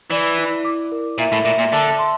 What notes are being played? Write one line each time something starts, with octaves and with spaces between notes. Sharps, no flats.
E3 D5
E4
D6
A#4
A#2 E5
A2
A#2 E5
A#2
D3 A5
C6